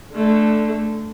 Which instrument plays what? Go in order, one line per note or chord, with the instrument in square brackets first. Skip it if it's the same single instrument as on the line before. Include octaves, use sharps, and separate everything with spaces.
[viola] D3 A3